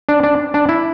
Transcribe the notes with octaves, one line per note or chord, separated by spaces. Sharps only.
D4
D4
D4
E4